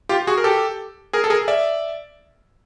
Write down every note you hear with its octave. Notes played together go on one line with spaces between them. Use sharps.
F4 G4
F#4 G#4
A#4
G4 A4
G#4 A#4
A4
G#4 A#4
D5 E5